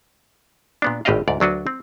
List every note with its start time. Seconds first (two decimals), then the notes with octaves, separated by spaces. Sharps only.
0.82 A#2 B3 D4
1.05 G#1 A2 G4 D5 D#5 F5
1.28 D2 G#2 D5
1.40 D2 F#3 D4 F#4 B4
1.67 C4